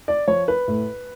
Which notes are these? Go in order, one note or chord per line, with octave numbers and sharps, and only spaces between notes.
D5
F3 C#5
B4
A2